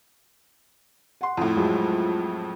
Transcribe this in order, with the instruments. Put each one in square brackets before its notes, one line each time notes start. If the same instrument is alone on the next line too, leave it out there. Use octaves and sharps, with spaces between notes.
[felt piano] F#5 C6
[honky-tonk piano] F2 A2
[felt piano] F3 F#3 G#3